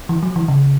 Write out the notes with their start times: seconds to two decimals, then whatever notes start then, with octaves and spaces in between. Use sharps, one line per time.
0.09 E3
0.23 F#3
0.36 E3
0.48 C#3